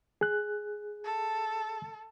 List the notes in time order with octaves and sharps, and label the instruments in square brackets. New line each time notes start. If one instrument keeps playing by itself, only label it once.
[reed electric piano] G#4 F#6
[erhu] A4